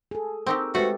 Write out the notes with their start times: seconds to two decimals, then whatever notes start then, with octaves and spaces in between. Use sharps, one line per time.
0.11 G#4 A4
0.47 C4 D#4 G4 A#4 C#6 E6
0.75 G#3 A3 F#4 G4 B4 C5